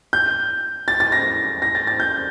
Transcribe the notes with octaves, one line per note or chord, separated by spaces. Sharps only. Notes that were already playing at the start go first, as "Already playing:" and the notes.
G6
A6
A6
A#6
A#6
A6
A6
G6